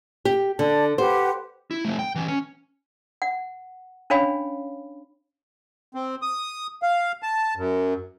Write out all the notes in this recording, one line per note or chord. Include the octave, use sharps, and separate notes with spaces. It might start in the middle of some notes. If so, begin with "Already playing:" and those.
G4
D3 D5 A5
G4 B4 C5 F#5
E4
F3 A3
G5
E3 C#4
C#4
F#5
C#4 D4 C#5 F5 G#5 B5
C4
D#6
F5
A5
F#2